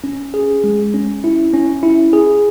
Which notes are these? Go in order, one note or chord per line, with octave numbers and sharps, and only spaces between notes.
C#4
G#4
G#3
C#4
E4
C#4
E4
G#4